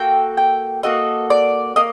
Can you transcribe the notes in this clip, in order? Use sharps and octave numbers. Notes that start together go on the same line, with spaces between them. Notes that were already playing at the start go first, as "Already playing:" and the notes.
Already playing: A#3 F#4 A4 G5
G5
A#3 F#4 A4 D#5
D5
A#3 D#5